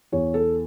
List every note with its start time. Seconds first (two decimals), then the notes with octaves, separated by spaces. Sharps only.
0.12 E2 C#5
0.34 A4